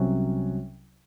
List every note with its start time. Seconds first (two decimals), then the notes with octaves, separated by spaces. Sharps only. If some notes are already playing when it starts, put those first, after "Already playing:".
Already playing: C2 C3 F#3 C#4